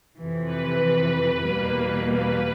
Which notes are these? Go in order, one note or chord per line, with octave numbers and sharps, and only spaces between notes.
F2 C3 E3
B4
E2 B2 G3 A#3
B4